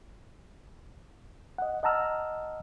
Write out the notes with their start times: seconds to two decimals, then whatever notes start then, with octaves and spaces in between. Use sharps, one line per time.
1.58 D#5 F#5
1.83 D#5 F#5 A5 A#5 E6 F6